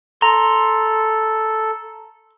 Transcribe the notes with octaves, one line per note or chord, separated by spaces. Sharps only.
A4 A#5 C6